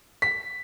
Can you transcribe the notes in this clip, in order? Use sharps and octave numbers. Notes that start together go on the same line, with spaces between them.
B6